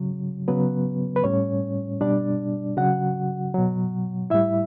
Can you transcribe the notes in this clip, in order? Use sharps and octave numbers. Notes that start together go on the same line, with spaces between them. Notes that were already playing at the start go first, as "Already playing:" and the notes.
Already playing: C#3 F#3
C#3 F#3 B3 B4
B4
A2 G3 C#4 C#5
B2 G3 D4 D5
C#3 F#3 F#4 F#5
B2 F#3
A2 G3 E4 E5